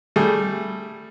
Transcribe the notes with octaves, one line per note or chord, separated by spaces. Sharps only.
G3 A3 G#4